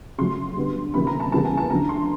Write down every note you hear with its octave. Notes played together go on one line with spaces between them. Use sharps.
C#3 F#3 A3 C6
D3 G3 B3
D2 C3 D#3 F#3 A#3 B5
A#5
A5
E2 C#3 E3 G3 A#3 A5
G#5
A5
D2 D3 F#3 A#5
C6